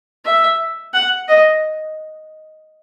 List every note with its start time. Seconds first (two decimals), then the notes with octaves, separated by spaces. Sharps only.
0.25 E5
0.94 F#5
1.28 D#5